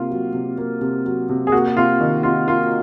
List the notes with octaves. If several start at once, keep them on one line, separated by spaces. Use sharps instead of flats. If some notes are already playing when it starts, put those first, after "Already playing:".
Already playing: C3 A#3 F4
F#3
C3
A#3
C3
F#3
C3
G#4
A#3 F#4
C3 F4
D#3
C3 F4
A#3 F4